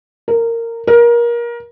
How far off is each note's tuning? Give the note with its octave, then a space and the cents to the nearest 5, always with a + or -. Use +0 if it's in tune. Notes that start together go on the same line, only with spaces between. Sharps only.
A#4 -15
A#4 +25